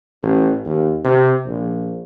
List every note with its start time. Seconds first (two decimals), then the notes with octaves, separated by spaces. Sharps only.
0.22 A1
0.65 D#2
1.04 C3
1.46 A#1